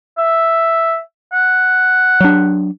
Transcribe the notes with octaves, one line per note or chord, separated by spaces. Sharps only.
E5
F#5
F#3 D4